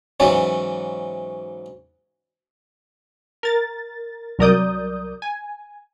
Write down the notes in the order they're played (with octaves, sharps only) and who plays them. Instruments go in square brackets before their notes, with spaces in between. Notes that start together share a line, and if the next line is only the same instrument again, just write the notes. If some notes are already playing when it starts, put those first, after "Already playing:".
[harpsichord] G#2 E3 F#3 C#4
[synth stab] A#4 A6
C2 F#3 A#4 D5 D#6 G6
G#5